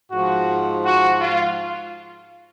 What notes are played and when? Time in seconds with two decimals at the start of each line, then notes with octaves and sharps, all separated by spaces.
0.11 G#2 F3 F#4
0.84 F#4
1.20 F4